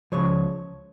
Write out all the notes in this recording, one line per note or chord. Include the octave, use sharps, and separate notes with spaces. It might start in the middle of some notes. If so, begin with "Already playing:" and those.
C#2 C#3 F3 C#5